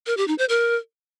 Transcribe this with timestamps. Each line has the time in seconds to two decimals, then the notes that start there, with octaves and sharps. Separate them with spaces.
0.06 A#4
0.17 G4
0.28 D#4
0.38 C5
0.49 A#4